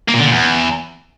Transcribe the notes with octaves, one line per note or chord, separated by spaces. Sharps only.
A#3
A#2
D3
A#2
E2